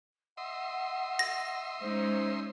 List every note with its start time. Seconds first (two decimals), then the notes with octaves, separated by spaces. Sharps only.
0.37 D#5 E5 F#5 C6
1.19 A#6
1.81 G#3 C#4 D#4 C5